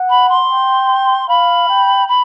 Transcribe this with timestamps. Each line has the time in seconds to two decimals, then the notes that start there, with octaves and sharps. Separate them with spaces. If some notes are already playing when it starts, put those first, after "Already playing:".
Already playing: F#5
0.09 B5
0.29 C6
0.50 G5
1.28 F5 B5
1.69 G5
2.08 B5